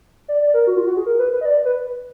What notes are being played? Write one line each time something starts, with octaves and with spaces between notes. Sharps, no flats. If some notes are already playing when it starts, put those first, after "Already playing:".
D5
D5
A#4
F#4
F4
F#4
G#4
A#4
B4
B4
D#5
D5
B4